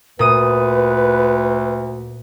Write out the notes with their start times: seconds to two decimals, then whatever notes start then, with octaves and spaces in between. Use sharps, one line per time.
0.19 D2 A#2 B4 D#6 D#7